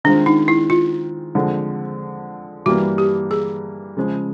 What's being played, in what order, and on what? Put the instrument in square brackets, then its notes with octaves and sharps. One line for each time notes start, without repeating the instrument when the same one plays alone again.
[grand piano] D#3 G#3 C4 F4 [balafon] D4
[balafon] D#4
E4
F4
[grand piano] D3 F3 G#3 C4
[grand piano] G2 E3 G3 A#3 [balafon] F#4
[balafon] G4
G#4
[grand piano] C#3 F3 G#3